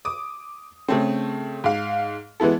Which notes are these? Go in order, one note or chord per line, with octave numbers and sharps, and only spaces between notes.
D6 D#6
C#3 A3 C4
G#2 F5
E3 G#3 B3 E4 A4